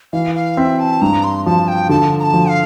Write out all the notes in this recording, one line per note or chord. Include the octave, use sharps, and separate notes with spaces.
E3 F5
F5
C4 E5
A5
G2 A#5
C6
F3 A5
G5
D3 A5
A#5
A5
F3
F5